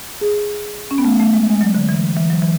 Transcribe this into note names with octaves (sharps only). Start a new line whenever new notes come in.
G#4
C#4
B3
A3
A3
G#3
G#3
F#3
D3
E3
E3
F#3
E3